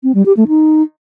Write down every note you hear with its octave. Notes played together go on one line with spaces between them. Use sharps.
C4
G3
G4
A3
D#4